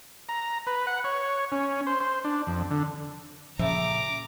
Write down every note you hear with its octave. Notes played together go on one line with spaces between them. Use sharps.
A#5
B4
F#5
C#5
C#4
C5
C5
D4
F2
D3
A#2 C#3 F3 E5 A#5 D6